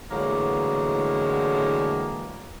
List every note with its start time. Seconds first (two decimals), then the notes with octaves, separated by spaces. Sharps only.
0.11 A2 D3 E3 F#3 G#3 A#3